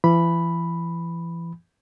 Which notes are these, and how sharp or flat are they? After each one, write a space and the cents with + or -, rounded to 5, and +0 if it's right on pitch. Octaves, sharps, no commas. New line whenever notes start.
E3 +35 B5 +0